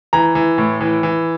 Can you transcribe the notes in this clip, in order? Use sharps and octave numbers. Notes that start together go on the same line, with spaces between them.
E3 A#5
E3
A2
E3
E3